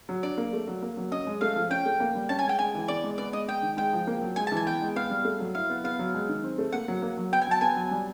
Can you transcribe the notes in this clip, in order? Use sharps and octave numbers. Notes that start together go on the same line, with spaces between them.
F#3
D4 D5
A#3
A3
F#3
A#3
F#3
C#4 D#5
G#3
A3 F5
F3
C#4 G5
A3
A#3
G3
C#4 A5
G#5
G#3
G5
G#3 G#5
E3
B3 D5
G#3
B3 D5
G#3 D#5
G#3 G5
D#3
G#3 G5
F3
A#3
F#3
G#3 G#5
A5
E3 G#5
B3 G5
G#3
B3 F5
G3
A3
F#3
E4 F5
B3
B3 F5
F#3
G#3
D#3
C4
A3
A#3 F#5
F#3
A#3
F#3
B3 G5
G#5
F#3 A5
B3 G#5
F#3
G3